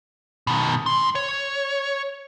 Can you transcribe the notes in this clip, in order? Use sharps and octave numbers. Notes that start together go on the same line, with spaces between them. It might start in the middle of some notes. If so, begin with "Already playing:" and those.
B2 D#3
G#2 C6
C#5